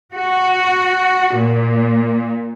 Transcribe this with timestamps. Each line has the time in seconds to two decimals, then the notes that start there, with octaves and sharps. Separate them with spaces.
0.13 F#4
1.36 A#2